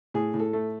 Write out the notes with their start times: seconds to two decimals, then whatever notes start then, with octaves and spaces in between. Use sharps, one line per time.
0.14 A2 G#4
0.34 A2
0.40 A4
0.53 A3